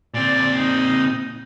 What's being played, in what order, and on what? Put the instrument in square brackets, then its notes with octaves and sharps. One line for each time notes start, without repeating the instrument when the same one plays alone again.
[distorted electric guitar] A#2 C4 [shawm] D5
[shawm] D#4